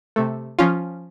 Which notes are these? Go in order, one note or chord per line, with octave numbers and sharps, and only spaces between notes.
C3 A3
F3 C#4 F4